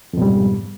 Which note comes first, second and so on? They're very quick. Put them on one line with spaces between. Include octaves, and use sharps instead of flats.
F2 B2 G3 G#2